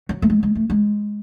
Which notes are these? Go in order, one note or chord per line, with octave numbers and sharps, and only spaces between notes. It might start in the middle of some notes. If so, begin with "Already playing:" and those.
F#3
A3
G#3
G#3
A3
G#3